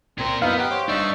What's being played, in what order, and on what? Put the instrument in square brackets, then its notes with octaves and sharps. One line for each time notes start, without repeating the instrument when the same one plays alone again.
[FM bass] C#2 [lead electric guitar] A#2 A#4 [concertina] C4
[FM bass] F#2 [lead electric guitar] B3 [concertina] D#4 E4 A#4 [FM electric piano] F5
[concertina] B3 F#5 D#6 [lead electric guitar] G4
[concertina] C5 C#5
[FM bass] F1 [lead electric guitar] G2 D4 [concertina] D#4 E5 C#6